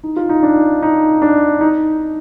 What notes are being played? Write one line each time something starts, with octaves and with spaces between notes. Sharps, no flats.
D#4
F4
D#4
D4
D#4
D4
D#4